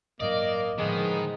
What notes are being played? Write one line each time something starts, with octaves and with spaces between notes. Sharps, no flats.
A1 G2 F#3 A#3 D5 D#5
A2 D3 D#3 F3 G#3 B3